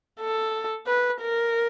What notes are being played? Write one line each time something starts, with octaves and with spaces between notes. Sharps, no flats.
A4
B4
A#4